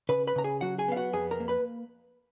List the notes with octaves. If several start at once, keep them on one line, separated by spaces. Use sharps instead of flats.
C#3 B4 B5
B4 B5
C#3 A#5
G#4 G#5
F#3 F#4 F#5
G#4 G#5
B3 F5
F#4 F#5
F2 G#4 G#5
A#4 A#5
A#3
B4 B5